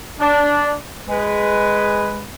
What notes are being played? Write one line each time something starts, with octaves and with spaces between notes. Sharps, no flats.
D4
G#3 B4